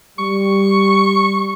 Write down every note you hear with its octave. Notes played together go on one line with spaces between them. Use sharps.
G3 C#6